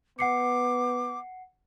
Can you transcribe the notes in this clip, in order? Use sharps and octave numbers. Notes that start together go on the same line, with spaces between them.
B3 F#5 D6 C7 C#7